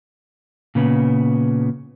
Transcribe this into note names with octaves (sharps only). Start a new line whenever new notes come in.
A#2 C#3 B3